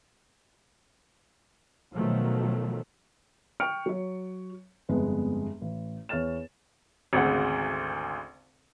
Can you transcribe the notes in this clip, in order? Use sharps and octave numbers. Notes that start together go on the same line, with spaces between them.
B2 D#3 F3 F#3 A3
G5 C#6 F6 C#7 D7
F#3 C#5
G1 F2 G#3 B3
A1
E2 C#5 F6 A6 E7
G#1 D2 C#3 F#5